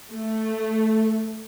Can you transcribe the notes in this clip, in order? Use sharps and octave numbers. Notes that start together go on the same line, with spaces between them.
A3